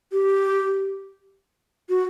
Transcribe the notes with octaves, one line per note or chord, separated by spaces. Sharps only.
G4
F#4